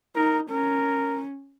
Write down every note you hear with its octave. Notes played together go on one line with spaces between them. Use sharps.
D#4 A#4
C#4 A#4